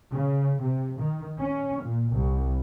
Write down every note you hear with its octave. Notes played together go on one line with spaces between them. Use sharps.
C#3
C3
D#3
C#4
A#2
C2